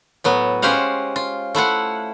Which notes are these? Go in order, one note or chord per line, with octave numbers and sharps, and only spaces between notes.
A2 F#3 B3
G#3 C#4 G4 C5 F5 F#5
F4
A3 E4 F4 F#5